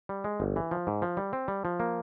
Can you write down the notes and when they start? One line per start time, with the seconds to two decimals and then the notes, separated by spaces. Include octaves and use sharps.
0.09 G3
0.24 G#3
0.40 G1
0.56 E3
0.71 F3
0.87 G#2
1.02 F3
1.17 G3
1.33 C4
1.48 G3
1.65 F3
1.80 A#3